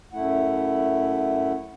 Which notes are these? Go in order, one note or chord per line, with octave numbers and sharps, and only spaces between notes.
F#2 A3 E4 F#5